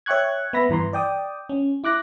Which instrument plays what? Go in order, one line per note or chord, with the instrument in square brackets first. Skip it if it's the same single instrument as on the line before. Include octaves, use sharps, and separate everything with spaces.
[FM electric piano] C#5 E5 G5 C#6 F#6 G#6
B3 E5 B5 A#6
G2 E3 A#5 C6
D5 G5 D#6
C#4
E4 D6 F#6 A#6